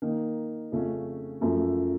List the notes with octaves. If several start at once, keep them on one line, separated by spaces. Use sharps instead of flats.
D#3 A#3 D#4
F2 C#3 A3 C#4
F#2 F3 A3